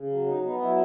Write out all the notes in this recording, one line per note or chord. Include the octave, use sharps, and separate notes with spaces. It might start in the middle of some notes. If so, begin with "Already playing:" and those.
Already playing: C#3
F#3
D#4
B3 D#4
F#3 E4